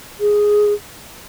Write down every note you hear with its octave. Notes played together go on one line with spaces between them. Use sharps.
G#4